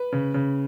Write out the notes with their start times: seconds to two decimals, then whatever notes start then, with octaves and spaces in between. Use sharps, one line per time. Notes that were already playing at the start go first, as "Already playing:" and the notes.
Already playing: B4
0.12 C#3
0.34 C#3